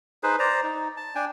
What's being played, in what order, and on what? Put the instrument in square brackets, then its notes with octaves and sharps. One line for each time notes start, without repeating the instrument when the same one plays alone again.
[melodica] D#4 G#4 B4 C5
C5 D5 A#5
D#4
A5
D4 G5 G#5